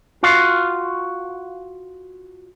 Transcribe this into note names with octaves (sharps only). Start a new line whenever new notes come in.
F4 F#4 F5